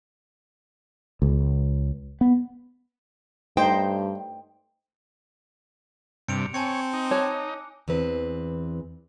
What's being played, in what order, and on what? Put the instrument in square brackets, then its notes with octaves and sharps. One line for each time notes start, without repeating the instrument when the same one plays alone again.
[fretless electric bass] C#2
B3
[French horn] G2 [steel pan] A3 D#4 C5 [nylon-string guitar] G5
[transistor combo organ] G2 C3 [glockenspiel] C#7 D7 F7
[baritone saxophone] C4 [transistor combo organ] C#5 [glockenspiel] G#5 A5 C#7
[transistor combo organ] D#4
[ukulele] C#5 A5 [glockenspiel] D6 F#6
[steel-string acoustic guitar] E2 E3 C4 B4